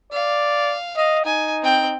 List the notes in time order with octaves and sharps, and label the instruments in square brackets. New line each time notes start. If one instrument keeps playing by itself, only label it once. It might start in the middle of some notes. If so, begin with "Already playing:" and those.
[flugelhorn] D5 [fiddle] F5
[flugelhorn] D#5 [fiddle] F5
[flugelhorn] D#4 [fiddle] G#5
[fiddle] C4 G5